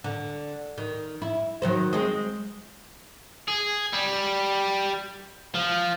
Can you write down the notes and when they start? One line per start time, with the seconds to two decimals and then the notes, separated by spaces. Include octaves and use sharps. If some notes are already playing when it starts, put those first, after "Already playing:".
0.04 D3
0.78 D#3
1.22 E4
1.62 D#3 F#3 C5
1.93 G#3 C4
3.48 G#4
3.93 G3
5.55 F3